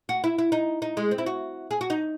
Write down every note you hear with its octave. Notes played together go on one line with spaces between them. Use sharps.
F#4
E4
E4
D#4
D#4
G#3
C4
E4
F#4
G#4
F#4
D#4